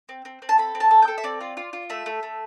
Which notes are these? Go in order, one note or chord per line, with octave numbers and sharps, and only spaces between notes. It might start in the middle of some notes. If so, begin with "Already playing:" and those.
C4
C4
C4
A5
A4 B5
C4
A5
A4
G5
A4
E5
C4 D5
F4
F4
F4
A3 E5
A3
A3